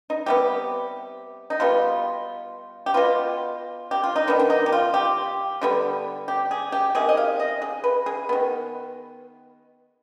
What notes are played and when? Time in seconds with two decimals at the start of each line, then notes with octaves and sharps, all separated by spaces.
0.10 D#4
0.26 C3 G3 B3 G4
1.50 D#4
1.60 B2 G3 B3 F4
2.86 G4
2.94 B2 B3 F4
3.91 G4
4.04 F4
4.16 D#4
4.27 D#3 B3 D4
4.39 D4
4.50 D#4
4.66 G4
4.72 F4
4.94 G4
5.61 D3 G3 B3
6.28 G4
6.51 G#4
6.72 G4
6.95 C3 D#3 G#4
7.09 D#5
7.17 F5
7.40 D#5
7.62 G#4
7.84 B4
8.06 G#4
8.29 D#3 B3